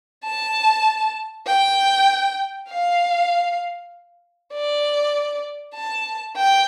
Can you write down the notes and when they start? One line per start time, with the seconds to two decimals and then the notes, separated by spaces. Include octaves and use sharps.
0.25 A5
1.47 G5
2.69 F5
4.53 D5
5.75 A5
6.36 G5